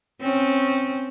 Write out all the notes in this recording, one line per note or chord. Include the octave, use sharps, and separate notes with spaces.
C4 C#4